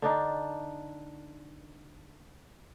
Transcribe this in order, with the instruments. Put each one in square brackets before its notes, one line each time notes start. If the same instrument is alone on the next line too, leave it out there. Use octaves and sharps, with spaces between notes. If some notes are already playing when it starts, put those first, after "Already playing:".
[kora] D3 D4 D#4